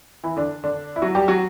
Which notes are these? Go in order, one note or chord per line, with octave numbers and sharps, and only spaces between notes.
E3 E4
D3 D4
D3 D4
E4
F#3 F#4
G3 G4
F#3 F#4